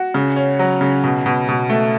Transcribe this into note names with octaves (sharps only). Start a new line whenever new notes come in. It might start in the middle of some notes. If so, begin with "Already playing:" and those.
Already playing: F#4
C#3
C#4
F#3
C#3
B2
B2
B2
A3